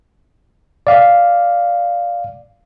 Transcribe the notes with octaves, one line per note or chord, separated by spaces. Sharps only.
D5 F5